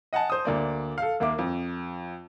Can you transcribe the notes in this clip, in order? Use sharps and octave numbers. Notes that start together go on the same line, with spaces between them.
D#5 F#5 G#5 A5
C5 D#6
D2 A#3 D5
A4 F5
D#2 A#3 E5 D6
F2